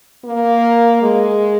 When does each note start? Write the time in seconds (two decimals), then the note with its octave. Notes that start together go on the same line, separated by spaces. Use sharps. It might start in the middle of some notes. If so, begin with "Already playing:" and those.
0.24 A#3
1.02 G#3